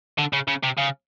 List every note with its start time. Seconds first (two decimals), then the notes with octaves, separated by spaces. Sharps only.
0.18 D3
0.33 C#3
0.48 C#3
0.64 C3
0.78 C#3